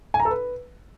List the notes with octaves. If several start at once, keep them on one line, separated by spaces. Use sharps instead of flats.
G#5
A#5
A4
B4